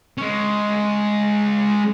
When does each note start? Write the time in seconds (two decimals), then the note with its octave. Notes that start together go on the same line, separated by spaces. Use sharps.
0.18 G#3 C#4